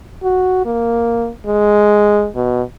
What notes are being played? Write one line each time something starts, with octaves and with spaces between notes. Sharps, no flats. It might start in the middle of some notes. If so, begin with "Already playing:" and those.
F#4
A#3
G#3
B2